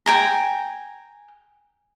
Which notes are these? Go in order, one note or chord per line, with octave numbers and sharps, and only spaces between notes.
G5 G#5 A#5